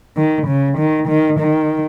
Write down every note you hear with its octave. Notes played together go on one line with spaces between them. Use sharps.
D#3
C#3
D#3
D#3
D#3